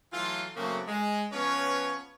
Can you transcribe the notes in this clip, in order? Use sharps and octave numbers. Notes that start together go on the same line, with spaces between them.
E3 F#3 A3 F4
C#3 F#3 A3 A#3 C4 F#4
G#3
F3 B3 C#4 F4 B4 C#5